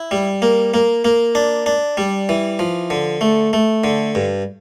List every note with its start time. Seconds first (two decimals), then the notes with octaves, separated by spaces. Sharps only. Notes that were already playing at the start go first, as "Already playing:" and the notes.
Already playing: E4
0.11 G3
0.42 A#3
0.74 A#3
1.05 A#3
1.35 D4
1.66 D4
1.97 G3
2.29 E3
2.59 F3
2.90 D3
3.21 A3
3.53 A3
3.84 D3
4.15 G2